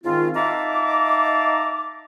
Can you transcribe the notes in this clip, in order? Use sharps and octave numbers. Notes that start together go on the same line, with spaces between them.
G#2 D#3 C4 F4
D#4 E5 F5 A5 A#5 D6